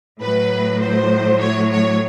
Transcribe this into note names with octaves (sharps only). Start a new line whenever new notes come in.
A2 F#3 B4
C5
C#5
C#5